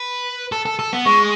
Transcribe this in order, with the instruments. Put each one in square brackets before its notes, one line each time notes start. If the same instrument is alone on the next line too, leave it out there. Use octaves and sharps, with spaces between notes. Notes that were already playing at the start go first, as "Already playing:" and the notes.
Already playing: [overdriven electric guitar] B4
A4
A4
A4
B3
[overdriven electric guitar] G#3 [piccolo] C#6